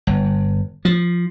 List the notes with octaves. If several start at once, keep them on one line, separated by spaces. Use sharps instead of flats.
G1
F3